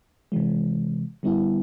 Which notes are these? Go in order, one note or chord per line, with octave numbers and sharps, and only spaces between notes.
C3 E3 G#3
D3 G3 B3 E4